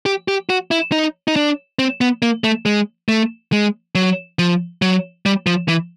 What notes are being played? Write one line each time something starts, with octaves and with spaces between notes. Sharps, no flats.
G4
G4
F#4
E4
D#4
D#4
D4
C4
B3
A#3
A3
G#3
A3
G#3
F#3
F3
F#3
G3
F3
E3